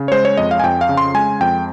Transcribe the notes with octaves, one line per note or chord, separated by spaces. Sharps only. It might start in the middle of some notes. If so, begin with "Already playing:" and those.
Already playing: C#3
C#5
G#3 C5
C#5
F2 D#5
F5
G#5
F2 G5
F5
C#3
C6
G#3 G#5
F2 G5